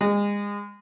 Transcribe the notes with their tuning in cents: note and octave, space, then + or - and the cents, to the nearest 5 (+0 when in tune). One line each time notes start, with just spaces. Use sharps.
G#3 -30